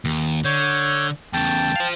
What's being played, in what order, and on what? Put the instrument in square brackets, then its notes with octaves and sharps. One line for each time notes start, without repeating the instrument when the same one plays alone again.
[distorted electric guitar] D#2
[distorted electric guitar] D3 [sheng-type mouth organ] C#5 G6
[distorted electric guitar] E2 C#3 [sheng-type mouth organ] G5 A5
[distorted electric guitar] C5 F5